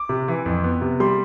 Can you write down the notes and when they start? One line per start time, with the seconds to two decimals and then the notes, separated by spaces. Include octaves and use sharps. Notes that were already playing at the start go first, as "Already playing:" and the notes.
Already playing: D6
0.09 C3
0.28 E3
0.46 F2
0.64 B3
0.82 C3
1.00 G3 C6